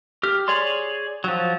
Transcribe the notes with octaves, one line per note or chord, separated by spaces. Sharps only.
G4 F6
G#4 C#5 D5 C6
F3 F#3